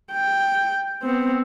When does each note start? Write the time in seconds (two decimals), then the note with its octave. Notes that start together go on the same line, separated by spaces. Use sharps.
0.12 G5
1.03 B3 C4